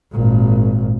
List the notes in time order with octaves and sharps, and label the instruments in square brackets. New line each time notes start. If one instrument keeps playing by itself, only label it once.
[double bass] G#1 A#2